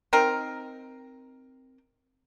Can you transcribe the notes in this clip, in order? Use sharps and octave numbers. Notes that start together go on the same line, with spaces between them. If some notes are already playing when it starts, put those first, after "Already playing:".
C4 D#4 A#4